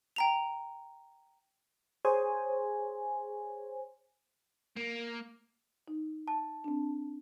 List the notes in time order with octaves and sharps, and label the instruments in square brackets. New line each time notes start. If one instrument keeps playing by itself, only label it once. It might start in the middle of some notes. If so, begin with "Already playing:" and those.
[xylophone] G5 A#5 F7
[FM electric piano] G#4 C5 C#5 G#5
[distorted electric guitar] A#3
[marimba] D#4
[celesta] A5
[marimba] C4 D4